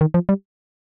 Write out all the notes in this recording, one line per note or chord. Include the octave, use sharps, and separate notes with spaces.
D#3
F3
G3